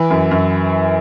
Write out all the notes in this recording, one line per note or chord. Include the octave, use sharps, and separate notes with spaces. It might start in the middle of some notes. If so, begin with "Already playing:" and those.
Already playing: E3
F#2
F#2